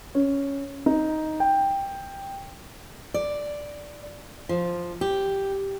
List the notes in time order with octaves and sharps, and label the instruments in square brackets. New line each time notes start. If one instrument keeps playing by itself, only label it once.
[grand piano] C#4
D#4
G5
[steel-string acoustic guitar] D5
F3
G4